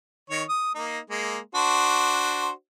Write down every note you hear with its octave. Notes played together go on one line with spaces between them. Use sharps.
D#3 C#5
D#6
A#3 D#4
G#3 A#3
D4 F#4 C5